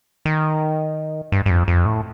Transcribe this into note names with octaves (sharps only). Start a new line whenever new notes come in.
D#3
G2
G2
F2
F2
A2